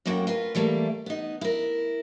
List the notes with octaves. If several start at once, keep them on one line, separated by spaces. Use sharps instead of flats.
F#2 A2 A#3 F#4 F#5 G5
F4 A#4 B4
E3 G3 A3 A#3
B3 D#4
E4 A#4